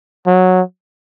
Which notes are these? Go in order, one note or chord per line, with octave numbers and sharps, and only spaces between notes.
F#3